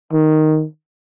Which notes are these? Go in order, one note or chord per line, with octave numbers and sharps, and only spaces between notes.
D#3